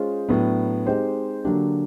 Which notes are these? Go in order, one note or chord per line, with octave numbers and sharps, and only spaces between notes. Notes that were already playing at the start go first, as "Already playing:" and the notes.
Already playing: G#3 C#4 F4 G#4 C5
A2 F#3 B3 D4
G#3 C4 D#4 G4 C5
D3 F#3 A#3 D4 G4